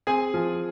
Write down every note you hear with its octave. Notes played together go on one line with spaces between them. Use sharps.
C4 G#4 G#5
F3